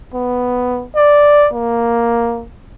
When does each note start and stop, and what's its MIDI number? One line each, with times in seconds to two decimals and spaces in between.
0.14 0.85 59
0.95 1.49 74
1.54 2.45 58